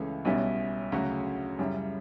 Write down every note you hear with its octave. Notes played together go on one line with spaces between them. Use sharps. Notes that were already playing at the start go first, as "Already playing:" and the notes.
Already playing: C#2 C#3 E3 A3 C#4
B1 B2 G3 C#4 E4
D2 C#3 F#3 C#4 F#4
F#2 C#3 G3 C#4 E4